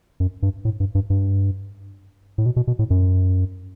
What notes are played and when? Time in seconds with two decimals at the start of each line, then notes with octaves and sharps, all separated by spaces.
0.20 F#2
0.43 G2
0.65 A2
0.80 G2
0.95 G2
1.10 G2
2.38 A2
2.46 B2
2.57 B2
2.68 B2
2.79 A2
2.90 F#2